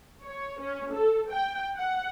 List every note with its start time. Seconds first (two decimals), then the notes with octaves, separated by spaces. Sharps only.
0.24 C#5
0.60 C#4
0.93 A4
1.31 G5
1.77 F#5